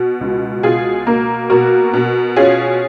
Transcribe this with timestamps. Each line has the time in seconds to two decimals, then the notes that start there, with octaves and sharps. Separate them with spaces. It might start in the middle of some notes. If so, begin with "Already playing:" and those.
Already playing: B2
0.21 C#2
0.63 B2 F4 G#4
1.07 A#3
1.50 B2 F#4 A#4
1.93 B2
2.36 C#4 F4 G#4